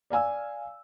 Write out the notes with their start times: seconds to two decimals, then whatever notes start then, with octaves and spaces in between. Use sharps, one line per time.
0.10 D5 F5 G#5 E6